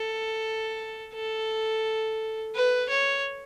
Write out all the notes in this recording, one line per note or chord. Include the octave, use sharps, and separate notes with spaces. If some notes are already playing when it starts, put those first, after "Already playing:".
Already playing: A4
A4
B4
C#5